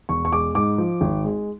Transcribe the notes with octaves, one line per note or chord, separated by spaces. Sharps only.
E1 C#6
C#6
G#3 D6
G#2 D6
F3
G#1
G#3